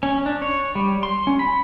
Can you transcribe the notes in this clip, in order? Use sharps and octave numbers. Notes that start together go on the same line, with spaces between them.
C#4
D4
C#5
G3
C6
C#4
B5